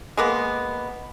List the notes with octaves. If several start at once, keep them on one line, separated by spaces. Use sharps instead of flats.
G#3 A#3 B3